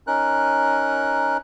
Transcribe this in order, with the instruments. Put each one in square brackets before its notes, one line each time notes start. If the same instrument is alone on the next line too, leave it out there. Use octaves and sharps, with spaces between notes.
[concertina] C#4 D#4 A#4 F#6